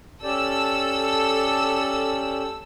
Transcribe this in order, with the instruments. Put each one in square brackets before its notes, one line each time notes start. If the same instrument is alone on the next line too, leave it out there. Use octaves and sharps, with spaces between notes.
[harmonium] C#4 G4 D5 [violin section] A4 E6